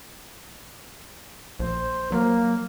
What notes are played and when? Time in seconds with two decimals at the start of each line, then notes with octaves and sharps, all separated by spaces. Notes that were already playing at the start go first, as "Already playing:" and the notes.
1.59 A#1 C5
2.12 F#3 A#3